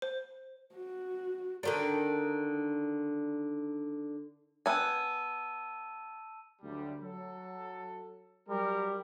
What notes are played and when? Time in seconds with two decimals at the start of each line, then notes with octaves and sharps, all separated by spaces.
0.02 C5
0.75 F#4
1.63 D3 D#3 D4
4.66 B3 G#5 A5 E6 D#7
6.62 D2 F#3 G3
7.01 F#3 A4
8.49 F#3 G3 A#4